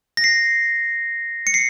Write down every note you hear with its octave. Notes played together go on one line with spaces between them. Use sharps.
A#6
C7
C#7
C7